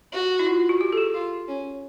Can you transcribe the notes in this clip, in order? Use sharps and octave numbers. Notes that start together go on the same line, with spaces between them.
F#4
E4
F4
F#4
G4
A4
G#4
F4
C#4